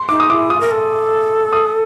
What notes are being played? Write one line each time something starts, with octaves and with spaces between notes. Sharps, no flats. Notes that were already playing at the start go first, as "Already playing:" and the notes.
Already playing: C6
D#4 D6
D#6
E4 D6
F4 D#6
A#4
A4
D#6